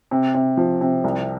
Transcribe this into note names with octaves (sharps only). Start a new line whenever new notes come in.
C3
C3
F3
C3
C2